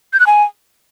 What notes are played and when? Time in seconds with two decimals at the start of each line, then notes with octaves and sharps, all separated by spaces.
0.13 G6
0.20 F#6
0.27 G#5